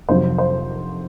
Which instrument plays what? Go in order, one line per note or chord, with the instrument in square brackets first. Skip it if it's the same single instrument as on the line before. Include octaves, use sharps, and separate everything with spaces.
[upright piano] F2 C3 D#3 F#3 C5
C5